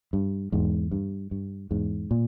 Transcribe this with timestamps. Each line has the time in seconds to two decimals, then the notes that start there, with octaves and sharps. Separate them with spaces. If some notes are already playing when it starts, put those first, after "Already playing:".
0.13 G2
0.52 E2 G#2
0.91 G2
1.31 G2
1.71 E2 G#2
2.11 A#2